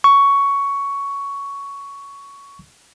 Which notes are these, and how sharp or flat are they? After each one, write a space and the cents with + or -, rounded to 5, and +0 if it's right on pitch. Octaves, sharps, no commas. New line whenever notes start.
C#6 +10